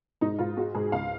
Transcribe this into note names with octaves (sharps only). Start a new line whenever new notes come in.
G#2 D#4
G#2 F4
G#3 F#4
G#2 G#4
C#2 F5